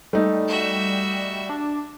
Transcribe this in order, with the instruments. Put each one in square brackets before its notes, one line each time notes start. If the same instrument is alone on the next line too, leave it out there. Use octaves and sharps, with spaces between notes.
[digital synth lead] G3 [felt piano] A3 D#4
[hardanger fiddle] F#4 E5
[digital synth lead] D4